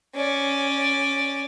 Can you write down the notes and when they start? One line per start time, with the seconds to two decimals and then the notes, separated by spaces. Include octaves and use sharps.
0.15 C#4 D5